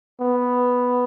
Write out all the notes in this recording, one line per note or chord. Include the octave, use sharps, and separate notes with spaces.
B3